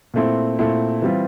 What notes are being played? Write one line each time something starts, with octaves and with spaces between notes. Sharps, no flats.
A#2 A3 C4 E4
A#2 A3 C4 E4
E3 G3 C4 F4